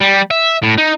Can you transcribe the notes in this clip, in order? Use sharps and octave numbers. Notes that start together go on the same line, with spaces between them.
G3
E5
A2
D#4